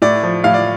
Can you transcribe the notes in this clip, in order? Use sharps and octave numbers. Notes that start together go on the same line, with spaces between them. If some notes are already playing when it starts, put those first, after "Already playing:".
A2 D5
F3
A2 F5
D5